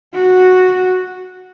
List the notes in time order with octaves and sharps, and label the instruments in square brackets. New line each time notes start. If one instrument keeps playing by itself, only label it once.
[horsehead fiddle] F#4